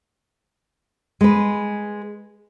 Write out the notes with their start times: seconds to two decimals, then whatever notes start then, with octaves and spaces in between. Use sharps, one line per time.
1.21 G#3 B4